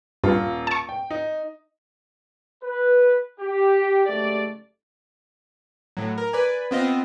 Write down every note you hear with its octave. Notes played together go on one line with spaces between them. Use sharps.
D#1 G2 F4
A5 C#6
G5
D#4
B4
G4
F#1 G#2 A3 G4 D5
A2 F#3
A#4
B4 D5 G#5
B3 C4 F4 D#5